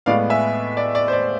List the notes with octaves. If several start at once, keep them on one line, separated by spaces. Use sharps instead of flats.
A2 G#3 B3 D5 F5
E5 G#5
D5
D5
C5
D5